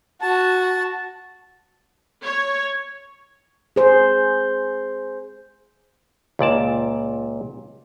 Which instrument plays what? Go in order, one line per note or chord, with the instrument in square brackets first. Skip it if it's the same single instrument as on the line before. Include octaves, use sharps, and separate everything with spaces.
[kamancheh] F#4 [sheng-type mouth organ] A5
[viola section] C#5
[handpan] G#4 C5
[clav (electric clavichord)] C#2 A#2 D5 A5